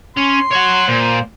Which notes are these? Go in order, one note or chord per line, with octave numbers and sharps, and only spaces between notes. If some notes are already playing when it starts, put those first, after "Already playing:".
C#4 C6
C#5 F#5
A#2 C5